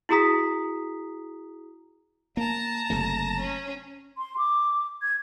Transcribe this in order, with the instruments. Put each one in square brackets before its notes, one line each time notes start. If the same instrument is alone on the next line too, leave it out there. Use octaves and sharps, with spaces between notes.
[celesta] E4 F#4 G#4 A#5 D#6 B6
[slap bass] A#3 [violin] A5 A#5
[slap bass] F#1 C3 A3
[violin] C#4
[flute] C6
D6
G#6